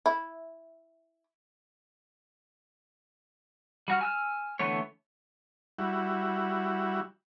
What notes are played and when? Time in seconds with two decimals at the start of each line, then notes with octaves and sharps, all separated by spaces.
0.06 E4
3.88 G3 F#4 F6
4.01 G#5 E6 F6
4.59 D3 E3 A3 B3 C#5
5.79 G3 E4 F#4